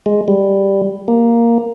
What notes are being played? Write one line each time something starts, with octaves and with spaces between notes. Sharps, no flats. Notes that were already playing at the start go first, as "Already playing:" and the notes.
G#3
G3
A#3